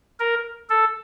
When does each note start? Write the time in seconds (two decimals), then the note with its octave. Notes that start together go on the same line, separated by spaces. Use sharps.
0.19 A#4
0.69 A4